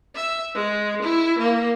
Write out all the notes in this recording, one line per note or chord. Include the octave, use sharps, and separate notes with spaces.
E5
G#3
E4
A#3